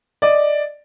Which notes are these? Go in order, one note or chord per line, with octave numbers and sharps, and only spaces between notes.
D5 D#5